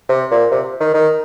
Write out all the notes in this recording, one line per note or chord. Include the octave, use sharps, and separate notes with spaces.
C3
A#2
C3
D#3
D#3